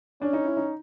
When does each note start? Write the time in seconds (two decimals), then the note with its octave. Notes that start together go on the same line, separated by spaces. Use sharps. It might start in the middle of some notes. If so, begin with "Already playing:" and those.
0.21 C#4 D4
0.33 D#4
0.45 E4
0.57 D#4